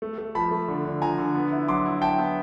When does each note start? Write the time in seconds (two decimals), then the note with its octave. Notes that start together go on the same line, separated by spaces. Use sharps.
0.02 A3
0.18 A3
0.35 F3 A5 B5
0.51 A3
0.68 D3
0.85 D3
1.02 F3 G#5 A#5
1.18 D3
1.35 B3
1.52 E4
1.68 F#3 C6 D6
1.85 E4
2.02 E4 G5 A5
2.19 B3